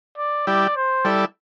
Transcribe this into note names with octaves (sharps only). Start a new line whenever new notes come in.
D5
G3 E4 G4 D5
C5
G3 E4 A4 D5